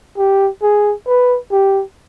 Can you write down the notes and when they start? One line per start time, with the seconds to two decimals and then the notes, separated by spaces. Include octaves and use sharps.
0.17 G4
0.62 G#4
1.07 B4
1.52 G4